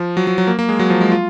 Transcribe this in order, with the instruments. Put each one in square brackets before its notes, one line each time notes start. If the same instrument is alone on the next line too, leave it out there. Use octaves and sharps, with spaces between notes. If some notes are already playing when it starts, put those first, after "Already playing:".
Already playing: [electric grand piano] F3
F#3
F#3
F#3
A#3
A#3
G#3
F#3
F3
G#3
F4